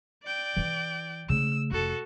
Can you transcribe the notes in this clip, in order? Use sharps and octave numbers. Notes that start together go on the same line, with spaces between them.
D5 G5
E3 E4
C#3 A3 E6
F1 F#4 A4